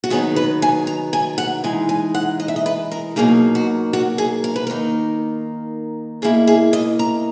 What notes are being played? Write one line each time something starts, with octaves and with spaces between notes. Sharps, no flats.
F#4
D#3 F#3 B3 D#4 G#4
B4
G#5
A#5
G#5
F#5
E3 G#3 D#4 G#5
G#5
F#5
D#5
E5
D#5
B4
A#4
B2 F#3 A#3 D#4 G#4
F#4
F#4
G#4
A#4
B4
D#3 A#3 D#4 A#4
B2 A#3 E4 G#4
G#4
D#5
A#5